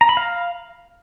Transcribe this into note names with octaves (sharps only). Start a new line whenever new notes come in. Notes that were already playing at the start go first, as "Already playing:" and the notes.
A#5
B5
F5